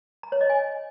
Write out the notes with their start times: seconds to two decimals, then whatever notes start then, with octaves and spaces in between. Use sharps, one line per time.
0.23 A#5
0.32 C#5
0.41 D#5
0.50 G#5